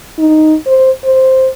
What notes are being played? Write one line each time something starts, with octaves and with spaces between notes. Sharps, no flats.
D#4
C5
C5